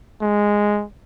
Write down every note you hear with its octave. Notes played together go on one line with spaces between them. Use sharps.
G#3